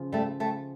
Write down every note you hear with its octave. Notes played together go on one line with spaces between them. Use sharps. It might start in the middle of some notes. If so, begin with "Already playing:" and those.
Already playing: C#3 F3
G3 A3
G3 A3